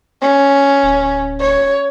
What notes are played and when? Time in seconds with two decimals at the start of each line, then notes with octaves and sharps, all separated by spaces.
0.22 C#4
0.83 D1
1.40 C#5